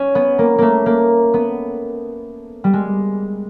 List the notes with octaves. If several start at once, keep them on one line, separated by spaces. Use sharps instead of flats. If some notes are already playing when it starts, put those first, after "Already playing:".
Already playing: C#4
B3
A#3
A3 A#3
A#3
B3
G3
G#3